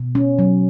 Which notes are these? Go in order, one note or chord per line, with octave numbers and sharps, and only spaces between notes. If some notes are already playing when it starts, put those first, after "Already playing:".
Already playing: B2
C#4
F#3